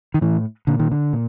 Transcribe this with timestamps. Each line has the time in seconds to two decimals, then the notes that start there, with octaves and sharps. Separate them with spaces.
0.14 D#3
0.21 A2 E3
0.67 A#2 D3
0.79 D#3
0.92 D3
1.13 A#2